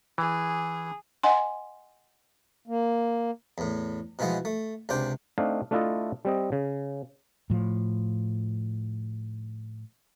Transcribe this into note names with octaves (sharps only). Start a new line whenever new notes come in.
E3 G#4
D#5 F#5 G#5 C6
A#3
E2 A2
B2 E3 F3 G#3 B3
A3
C#2 C3 D4 C5 G5
A3 C4 D4 D#4 F5
A3 D4 E4 F4 A4 D#5
G3 C4 D#5
C#3
A2 F3